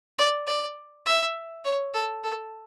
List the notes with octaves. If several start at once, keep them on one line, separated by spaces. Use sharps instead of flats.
D5
D5
E5
C#5
A4
A4